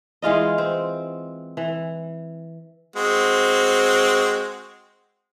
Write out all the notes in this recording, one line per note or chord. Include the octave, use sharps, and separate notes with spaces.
E3 G#3 F4 D#5
C4
E3
G#3 C4 F#4